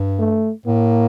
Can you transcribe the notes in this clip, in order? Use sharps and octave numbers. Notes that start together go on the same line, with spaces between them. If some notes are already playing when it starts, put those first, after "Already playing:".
Already playing: G2
A3
A2 A#3